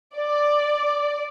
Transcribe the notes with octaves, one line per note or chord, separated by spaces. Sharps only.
D5